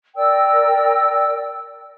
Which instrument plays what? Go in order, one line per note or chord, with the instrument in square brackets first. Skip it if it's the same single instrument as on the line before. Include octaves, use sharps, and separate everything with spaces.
[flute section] A#4 D5 G5 E6